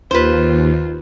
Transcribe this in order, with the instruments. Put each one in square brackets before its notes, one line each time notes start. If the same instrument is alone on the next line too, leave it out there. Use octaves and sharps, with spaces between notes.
[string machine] D#2 [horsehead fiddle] F4 [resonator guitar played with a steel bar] B4 C5